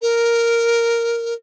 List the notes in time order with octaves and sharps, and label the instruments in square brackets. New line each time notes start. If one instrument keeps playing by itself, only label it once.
[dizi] A#4